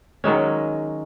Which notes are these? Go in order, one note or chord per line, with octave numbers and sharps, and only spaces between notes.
D#3 F#3 G#3 C#4